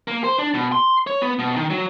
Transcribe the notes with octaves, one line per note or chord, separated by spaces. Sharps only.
A#3
C5
D4
B2
C6
C#5
B3
B2
D#3
F#3